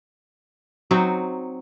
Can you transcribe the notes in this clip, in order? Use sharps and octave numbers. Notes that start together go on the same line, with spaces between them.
F#3 C4 D#4 F#4